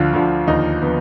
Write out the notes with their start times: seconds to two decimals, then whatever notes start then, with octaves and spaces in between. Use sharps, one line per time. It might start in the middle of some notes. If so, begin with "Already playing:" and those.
Already playing: D2 D3 F3 F4
0.13 D2 D3 F3
0.47 D#2 D3 F3 D#4
0.82 D3 F3 B3